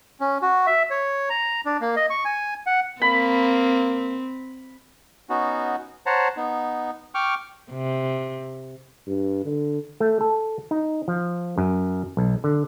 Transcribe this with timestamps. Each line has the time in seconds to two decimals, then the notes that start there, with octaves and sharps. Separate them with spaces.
0.21 C#4
0.42 F#4
0.67 E5
0.90 C#5
1.29 A#5
1.65 D4
1.81 A#3
1.96 D#5
2.10 C#6
2.25 G#5
2.67 F#5
3.02 A#3 C4 B5
5.29 B3 C#4 D#4 F#4
6.06 C5 C#5 F#5 A5 A#5
6.37 B3 D#4
7.15 G5 C#6 D6 F6
7.71 C3
9.07 G2
9.44 D3
10.00 A3
10.21 A4
10.71 D#4
11.08 F3
11.58 F#2
12.17 B1
12.44 D3